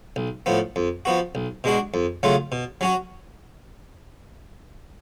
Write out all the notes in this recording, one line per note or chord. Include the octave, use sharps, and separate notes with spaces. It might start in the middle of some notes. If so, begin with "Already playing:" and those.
B1
A2 F3 B3
F2
F3 B3 F#4
B1
B2 G#3 D4 F#4
F2
C#3 F#3 A3 F4
B2
F#3 C#4 F#4